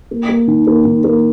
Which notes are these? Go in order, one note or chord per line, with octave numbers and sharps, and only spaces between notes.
A#3
A#3
D#3
A#3
D#3
A#3